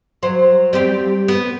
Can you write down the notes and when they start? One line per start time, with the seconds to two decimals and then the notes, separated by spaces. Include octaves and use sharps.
0.23 F#3 C5
0.73 G3 C4 G4
1.28 B3